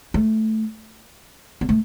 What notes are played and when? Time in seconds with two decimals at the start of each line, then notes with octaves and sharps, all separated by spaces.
0.14 A3
1.61 B3
1.69 A3